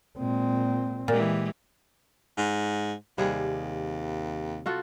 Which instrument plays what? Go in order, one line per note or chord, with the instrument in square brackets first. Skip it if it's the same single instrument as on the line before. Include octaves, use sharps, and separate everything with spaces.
[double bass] A#2 C4 [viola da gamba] G#3
[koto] A#2 [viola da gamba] E3 G#3 G4
[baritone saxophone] G#2
[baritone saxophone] D#2 [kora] C3 G3 G#4
[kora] F4 F#4 A4